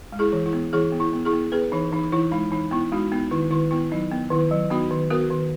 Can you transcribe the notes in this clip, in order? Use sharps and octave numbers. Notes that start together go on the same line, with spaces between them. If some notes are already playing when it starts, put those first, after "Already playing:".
G#3
E4 G#4
E3
E4
B3
E3 E4 G#4
B3
E4
B3
E4 G#4
B3
B3 G#4 B4
E3 D#4
E3 D#4
E3 E4
G#3 D#4
E3 D#4
B3 E4
G#3 D#4 F#4
B3 D#4
D#3 E4
D#3 E4
B3 E4
F#3 D#4
B3
D#3 E4
F#3
B3 D#4 F#4
D#3
B3 F#4 A#4
D#3